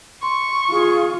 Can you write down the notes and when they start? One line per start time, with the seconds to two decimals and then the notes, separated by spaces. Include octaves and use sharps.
0.23 C6 C#6
0.71 F4 G#4